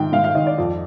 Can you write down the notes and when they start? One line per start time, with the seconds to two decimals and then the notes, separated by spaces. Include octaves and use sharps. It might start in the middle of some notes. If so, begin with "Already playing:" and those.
Already playing: G#2 D#3 G5
0.13 G#2 F5
0.24 F5
0.35 D#3 D#5
0.47 D5
0.58 F2